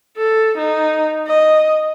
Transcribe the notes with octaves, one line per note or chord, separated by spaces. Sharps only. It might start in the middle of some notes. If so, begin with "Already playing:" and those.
A4
D#4
D#5